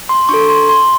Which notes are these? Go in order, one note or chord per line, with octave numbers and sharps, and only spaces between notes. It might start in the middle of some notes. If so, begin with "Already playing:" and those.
C6
D4 F#4 A4 C#6
C6
C6